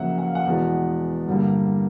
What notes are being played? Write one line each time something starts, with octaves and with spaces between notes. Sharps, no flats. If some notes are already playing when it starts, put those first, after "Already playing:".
Already playing: F2 C#3 F#3 A#3 E5 F#5
F#5
F5
F#5
E2 B2 G#3 B3 F#5
G2 D3 G3 A#3